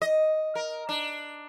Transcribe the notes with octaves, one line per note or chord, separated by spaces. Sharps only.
D#5
A#4
D4